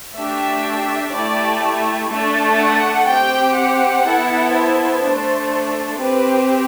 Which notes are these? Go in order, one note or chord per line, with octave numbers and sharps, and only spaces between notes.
A3 D4 G4 E5
A3 E4 G4 D5
A3 D4 A4
F#5
C4 G4 G5
F#5
B3 E4 A4
C5
A3 D4 A4
C4 G4 B4